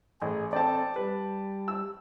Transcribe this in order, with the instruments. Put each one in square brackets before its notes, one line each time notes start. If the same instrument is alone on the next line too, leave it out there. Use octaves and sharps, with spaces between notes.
[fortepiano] A1 [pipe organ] G#4
[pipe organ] C4 A4 [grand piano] D5 G5 A5
[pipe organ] G3 [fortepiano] B4
[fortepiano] E6